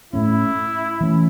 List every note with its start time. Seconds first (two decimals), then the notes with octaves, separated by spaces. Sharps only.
0.13 A2 A3 C#4 E4
1.01 E3 A3 C#4